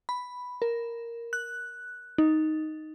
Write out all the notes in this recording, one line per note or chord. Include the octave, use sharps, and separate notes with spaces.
B5
A#4
F#6
D#4